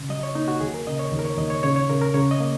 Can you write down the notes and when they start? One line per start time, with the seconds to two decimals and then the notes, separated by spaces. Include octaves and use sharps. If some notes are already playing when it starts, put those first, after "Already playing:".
Already playing: C#3
0.09 F#3 D#5
0.23 C#5
0.35 A#3 D#4
0.48 F#4
0.60 D#2 G#4
0.74 A#4
0.87 C#3 D#5
0.99 C#5
1.12 D#2
1.19 A#4
1.25 C#5
1.37 D#2 D#5
1.50 C#5
1.63 C#3 C#5
1.76 C#5
1.90 C#3 A#4
2.02 A#4
2.14 C#3 C#5
2.31 D#5
2.41 A#3